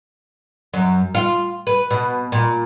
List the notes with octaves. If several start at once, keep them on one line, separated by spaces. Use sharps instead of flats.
F#2
F4
B4
B2
A#2